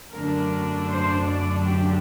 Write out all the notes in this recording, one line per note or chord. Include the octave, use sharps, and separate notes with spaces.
F#2 D3 A3 D4 A#4
C5
D5
G4